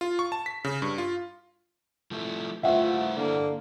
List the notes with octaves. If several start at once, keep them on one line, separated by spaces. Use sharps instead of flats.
F4
C#6
A5
B6
C#3
G2
F4
F3 A3 E4
G2 A3 E4 F4 C5 E5 F#5
D3 A#3